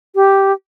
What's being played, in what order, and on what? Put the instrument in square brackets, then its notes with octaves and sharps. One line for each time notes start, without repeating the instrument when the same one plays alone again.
[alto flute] G4